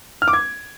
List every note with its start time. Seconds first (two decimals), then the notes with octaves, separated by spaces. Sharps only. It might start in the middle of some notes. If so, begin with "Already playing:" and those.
0.22 F6
0.28 D6
0.33 G#6